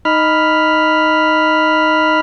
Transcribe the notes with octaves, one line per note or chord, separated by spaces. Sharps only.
D#4 B5 F6